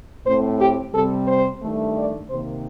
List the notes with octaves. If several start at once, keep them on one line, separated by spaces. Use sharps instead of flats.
A2 A3 C4 C5
G4
C3 G3 C4 A4
C5
G2 D#3 A3
D5
C3 D#3 A#3 C5